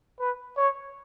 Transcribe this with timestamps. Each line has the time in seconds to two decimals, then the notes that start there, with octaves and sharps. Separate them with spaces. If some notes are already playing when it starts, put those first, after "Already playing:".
0.19 B4
0.57 C#5